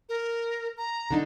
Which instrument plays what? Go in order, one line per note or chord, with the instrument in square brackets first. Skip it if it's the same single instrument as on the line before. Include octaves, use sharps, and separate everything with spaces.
[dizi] A#4
A#5
[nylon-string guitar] D3 D4 D#4